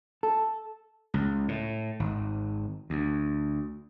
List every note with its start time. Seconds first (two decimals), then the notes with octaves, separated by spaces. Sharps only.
0.23 A4
1.14 C#2
1.48 A2
2.00 G#1
2.90 D2